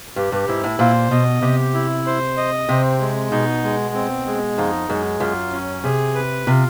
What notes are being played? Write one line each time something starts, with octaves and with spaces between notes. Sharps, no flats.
G2 G4
G2
G#2 E4
A2
A#2 C5
B2 D#5
C3 G4
E4
C5
D#5
C3 C4
G#3
B2 D#4
G#3
C4
G#3
F2 D#4
F#2 G#3
F#2 F4
C#4
C3 G#4
B4
C3 F4